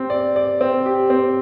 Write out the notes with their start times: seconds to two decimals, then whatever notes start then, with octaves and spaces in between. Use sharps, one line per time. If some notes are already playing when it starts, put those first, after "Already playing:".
Already playing: C4 G4
0.10 D5
0.36 D5
0.61 C4
0.86 G4
1.10 C4